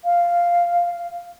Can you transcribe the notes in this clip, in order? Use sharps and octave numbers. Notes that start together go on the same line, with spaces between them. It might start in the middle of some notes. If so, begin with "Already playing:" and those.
F5